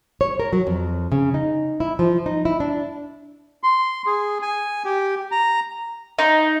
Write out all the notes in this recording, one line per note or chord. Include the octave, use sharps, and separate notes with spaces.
C#5
A#4
F#3
F2
C#3
D#4
E4
F3
D#4
E4
D4
C6
G#4
G#5
G4
A#5
D#4